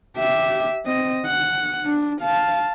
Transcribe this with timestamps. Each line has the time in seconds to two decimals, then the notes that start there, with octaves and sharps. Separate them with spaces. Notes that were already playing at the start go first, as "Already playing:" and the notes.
0.17 G4 E5
0.86 C4 D#5
1.26 F#5
1.85 D4
2.21 F5 A5